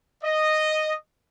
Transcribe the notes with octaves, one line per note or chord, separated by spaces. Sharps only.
D#5